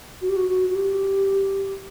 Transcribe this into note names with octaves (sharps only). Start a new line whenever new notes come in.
F#4
G4
F#4
F#4
F#4
G4